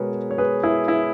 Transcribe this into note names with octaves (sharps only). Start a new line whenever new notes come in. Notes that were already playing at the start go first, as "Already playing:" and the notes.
Already playing: B2 G#3 G#4 A#4 B4 C#5
C#5
G#4 B4
E4 G#4
E4